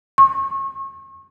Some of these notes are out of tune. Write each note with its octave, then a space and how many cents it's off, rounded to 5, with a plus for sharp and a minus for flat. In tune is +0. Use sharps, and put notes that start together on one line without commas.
C#6 -35